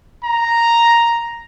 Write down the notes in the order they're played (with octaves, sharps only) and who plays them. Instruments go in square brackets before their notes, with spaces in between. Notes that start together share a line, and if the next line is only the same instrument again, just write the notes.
[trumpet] A#5